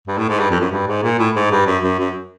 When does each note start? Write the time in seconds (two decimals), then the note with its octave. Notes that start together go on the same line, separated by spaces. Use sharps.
0.07 G2
0.18 A2
0.29 G#2
0.39 G2
0.51 F2
0.60 F#2
0.71 G2
0.87 G#2
1.03 A#2
1.18 A2
1.35 G#2
1.51 G2
1.66 F#2
1.83 F#2
1.99 F#2